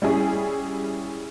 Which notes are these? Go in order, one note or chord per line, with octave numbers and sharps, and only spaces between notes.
G3 C#4 E4 G#4